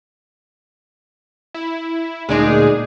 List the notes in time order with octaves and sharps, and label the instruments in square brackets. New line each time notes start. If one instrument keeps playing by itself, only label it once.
[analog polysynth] E4
[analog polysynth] D2 A#2 G#4 [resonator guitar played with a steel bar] G#3 D4 D#4